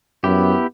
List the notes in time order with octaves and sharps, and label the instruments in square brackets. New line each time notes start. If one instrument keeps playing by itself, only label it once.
[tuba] F#2 [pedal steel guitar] B3 E4 G4